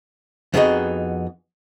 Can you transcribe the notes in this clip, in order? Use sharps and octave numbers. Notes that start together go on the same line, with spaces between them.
F2 B3 D#4 F#4 G#4 D#5